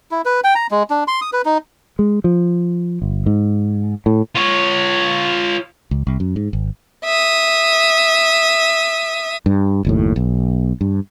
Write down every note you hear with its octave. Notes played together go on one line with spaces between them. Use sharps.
E4
B4
G5
A#5
G#3
D4
C6
D#6
B4
D#4
G#3
F3
G1
G#2
A2
F4 C#5
C#2
C2
F#2
G#2
G#1
E5 D#6
G2
F#1 D#2 A2
B1
G2